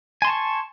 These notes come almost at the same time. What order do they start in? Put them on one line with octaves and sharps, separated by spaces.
G#5 C6 A5 C#6